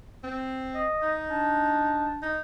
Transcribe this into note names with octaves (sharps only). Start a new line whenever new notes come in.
C4
D#5
D#4
D4
D#4